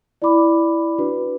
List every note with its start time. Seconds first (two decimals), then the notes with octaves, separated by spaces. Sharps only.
0.22 E4 D5 B5 D6
0.98 D4 F#4 B4